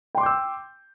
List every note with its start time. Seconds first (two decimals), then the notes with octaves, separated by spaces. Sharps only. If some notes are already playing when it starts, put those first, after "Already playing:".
0.15 G5
0.17 C6
0.20 D6
0.23 G6
0.26 E6